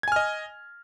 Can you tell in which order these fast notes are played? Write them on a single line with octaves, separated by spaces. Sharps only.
G#6 G#5 F6 D#5